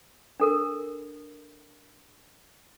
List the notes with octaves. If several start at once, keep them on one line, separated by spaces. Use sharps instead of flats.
D4 A4 A#4